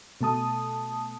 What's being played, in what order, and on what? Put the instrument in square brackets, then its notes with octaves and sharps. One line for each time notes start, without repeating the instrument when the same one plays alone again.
[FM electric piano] B2 A3 A5 D#6